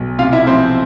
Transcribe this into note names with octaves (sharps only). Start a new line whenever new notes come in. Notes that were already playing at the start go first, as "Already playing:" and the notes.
Already playing: B1
C3 F4 F5
E4 E5
F3 C4 C5